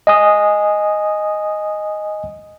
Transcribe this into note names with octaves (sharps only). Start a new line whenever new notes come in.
D#5 G#5 D#6